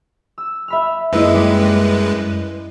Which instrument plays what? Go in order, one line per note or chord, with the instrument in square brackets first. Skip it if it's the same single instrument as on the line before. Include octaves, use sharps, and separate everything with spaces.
[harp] E6
E5 B5 F6
[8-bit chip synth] F#2 G#3 B4 [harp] A#3 E4 D#5
[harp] G3 D5 B6